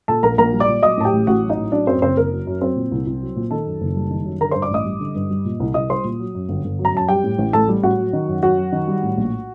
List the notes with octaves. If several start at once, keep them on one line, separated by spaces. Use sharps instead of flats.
A#2 A4 A5
A#1 A#4 A#5
A#1 A#4 A#5
G3
D5 D6
A#2
F#3 D#5 D#6
A2 A5
G4 G5
A1
A1 F#4 F#5
F#3
D#4 D#5
A2
F#3 D4 D5
F#2 C4 C5
F#1 C4 C5
F#1 A#4
F#3
F#2
F#3 C4 C5
A#2
C2
C2
F#3
A#2
D#3 A4 A5
F#2
F#1
G3
D#3
F#2
D3 A#4 A#5
G2 C5 C6
D5 D6
A1 D#5 D#6
G3
D3
G2
G3
A#2
C2
C2 D#5 D#6
G3 C5 C6
A#2
F#3
F#2
G1
G1
F#3
A#5
F#2 A5
G3 G4 G5
A2
A1
A1 A4 A5
G3
A2 F#4 F#5
F#3
D#3
F#2
F#2 F#4 F#5
F#3
D#3
G3
A2
A#1